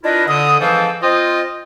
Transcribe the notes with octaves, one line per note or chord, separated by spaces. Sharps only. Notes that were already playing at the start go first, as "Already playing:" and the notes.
D4 E4 F4 A#4 B4 D#5
D3 D#6
G#2 E3 F3 C4 A4 F5
C4 F4 C5 D#5